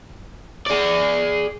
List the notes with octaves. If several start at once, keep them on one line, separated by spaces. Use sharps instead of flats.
G#4 D5